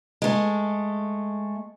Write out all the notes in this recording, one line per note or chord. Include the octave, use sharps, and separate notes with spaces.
G#3 A3